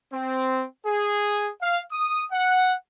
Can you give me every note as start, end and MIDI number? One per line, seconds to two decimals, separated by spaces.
0.12 0.64 60
0.86 1.49 68
1.62 1.80 77
1.92 2.24 87
2.32 2.74 78